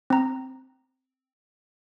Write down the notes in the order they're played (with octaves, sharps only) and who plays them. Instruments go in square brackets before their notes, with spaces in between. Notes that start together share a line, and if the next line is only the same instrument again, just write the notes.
[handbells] C4 A#5